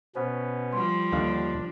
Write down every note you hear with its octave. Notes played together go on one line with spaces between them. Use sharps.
B2 B3 C#4 C5 F#5
F3 G3 C6
D#2 D3 D4 F5